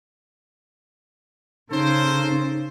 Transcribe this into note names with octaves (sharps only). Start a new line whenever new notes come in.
C#3 D#4 A4 A#4 C5